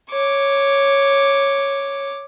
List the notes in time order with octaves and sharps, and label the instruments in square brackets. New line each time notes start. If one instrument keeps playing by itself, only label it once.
[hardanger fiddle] C#5 D6